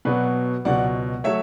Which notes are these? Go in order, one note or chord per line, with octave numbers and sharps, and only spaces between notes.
B2 F#3 B3 B4 D5
C#2 B2 F#3 D5 F#5
F#3 A3 C#5 E5